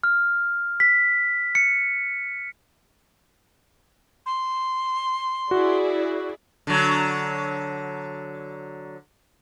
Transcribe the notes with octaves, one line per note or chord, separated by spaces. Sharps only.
F6
B6
C#7
C6
E4 F#4 G#4 D5
D3 F#3